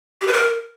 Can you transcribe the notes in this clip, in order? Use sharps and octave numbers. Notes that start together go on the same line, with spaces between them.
G4
B4
A#4